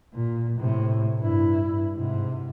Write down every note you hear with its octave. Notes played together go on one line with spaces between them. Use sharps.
A#2
A2 C3
G2 E4
G#2 C3